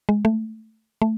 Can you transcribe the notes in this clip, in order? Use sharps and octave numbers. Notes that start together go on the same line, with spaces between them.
G#3
A3
A3